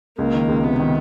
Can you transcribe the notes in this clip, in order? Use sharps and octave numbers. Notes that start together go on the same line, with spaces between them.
C#2 A#3
D#3
C#2
C3 B3
D#3